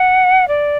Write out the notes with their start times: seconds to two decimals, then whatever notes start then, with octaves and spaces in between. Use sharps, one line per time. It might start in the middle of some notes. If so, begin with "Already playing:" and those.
Already playing: F#5
0.48 D5